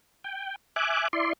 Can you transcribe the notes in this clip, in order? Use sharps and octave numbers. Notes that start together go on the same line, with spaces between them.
G5
E5 G#5 D6 F#6
E4 D5 C6